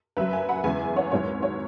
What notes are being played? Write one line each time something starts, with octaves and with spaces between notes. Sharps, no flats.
F#1 F#2 F#3 B4 E5
E5 G#5
F#5 B5
E2 C#3 G#3 E5 G#5
C#5 F#5
G#1 G#2 F#3 C#5
C#5